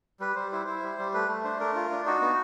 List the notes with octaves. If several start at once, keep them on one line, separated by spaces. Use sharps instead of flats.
G3 B4
G3 C5
E4 C5
E4 C5
G3
G3
A3 B4
A3
D4 C5
A3 A#4
F4
D4
D#4 F#4
B3